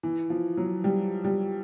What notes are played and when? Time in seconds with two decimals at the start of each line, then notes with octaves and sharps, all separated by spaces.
0.03 E3
0.30 F3
0.57 F#3
0.84 G3
1.24 G3